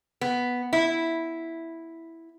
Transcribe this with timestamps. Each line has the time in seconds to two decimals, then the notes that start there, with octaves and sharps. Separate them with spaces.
0.21 B3
0.73 E4